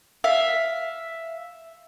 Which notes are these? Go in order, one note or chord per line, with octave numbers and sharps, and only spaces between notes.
E5 F5